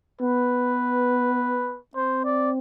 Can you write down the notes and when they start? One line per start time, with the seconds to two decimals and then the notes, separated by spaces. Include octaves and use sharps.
0.21 B3 B4
1.95 C4 C5
2.24 D5